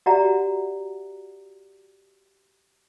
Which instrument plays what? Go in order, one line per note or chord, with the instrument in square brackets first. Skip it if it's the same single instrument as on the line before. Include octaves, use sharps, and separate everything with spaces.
[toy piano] F#4 G4 D5 E5 F#5 A#5